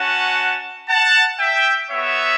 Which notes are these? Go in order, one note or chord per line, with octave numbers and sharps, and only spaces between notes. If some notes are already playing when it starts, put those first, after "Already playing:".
Already playing: C#4 F#4 F#5 A5
F#5 A5
E5 G5
B3 F#4 C#5 E5